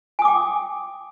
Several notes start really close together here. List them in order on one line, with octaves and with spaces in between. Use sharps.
G#5 D#6 D6 G5